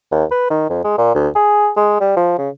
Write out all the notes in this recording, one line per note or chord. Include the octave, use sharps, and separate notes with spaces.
D#2
B4
D#3
F2
G#3
A#2
D2
G#4
G#3
G3
F3
C#3